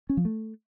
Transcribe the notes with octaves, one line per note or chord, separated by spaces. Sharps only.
C#4
F3
A3